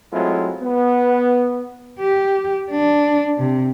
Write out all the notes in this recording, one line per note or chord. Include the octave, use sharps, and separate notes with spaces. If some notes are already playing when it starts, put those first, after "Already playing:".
F#3 G#3 A3 C4 E4 F4
B3
G4
D4
C3